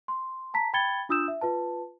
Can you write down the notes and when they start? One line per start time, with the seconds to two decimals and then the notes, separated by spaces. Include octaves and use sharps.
0.08 C6
0.54 A5 A#5 B6
0.73 G5 B5 G#6 A6 C#7 G7
1.09 D4 F4 D#6 E6 G6 E7
1.28 E5
1.41 F4 B4 A5